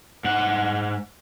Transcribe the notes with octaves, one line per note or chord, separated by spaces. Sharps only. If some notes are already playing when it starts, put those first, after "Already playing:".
G#2 F#5